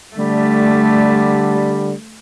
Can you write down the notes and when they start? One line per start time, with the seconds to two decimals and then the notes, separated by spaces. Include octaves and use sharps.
0.16 D3 G3 A3